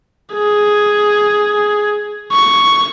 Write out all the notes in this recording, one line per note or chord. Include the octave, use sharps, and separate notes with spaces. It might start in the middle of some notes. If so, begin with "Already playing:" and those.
G#4
C#6